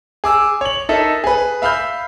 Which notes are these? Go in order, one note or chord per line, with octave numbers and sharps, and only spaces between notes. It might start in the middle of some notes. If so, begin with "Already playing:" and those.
G#4 D6 E6
C#5 F#7
D#4 A4 A#4 E5
G#4 B4
E5 F5 B5 F6 G6